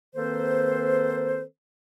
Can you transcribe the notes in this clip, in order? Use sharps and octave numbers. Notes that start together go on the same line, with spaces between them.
D#3 A#3 C4 A4 B4 C5